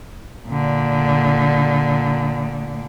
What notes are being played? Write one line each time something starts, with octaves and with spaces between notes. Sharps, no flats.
A#2 D3